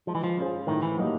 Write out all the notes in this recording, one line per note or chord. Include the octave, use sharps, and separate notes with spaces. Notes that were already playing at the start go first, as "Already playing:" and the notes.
F3 G#3
E3
F3
C#4 F4 G#4 C5
A2 D#3
E3
F#3 A#3 D#4 G4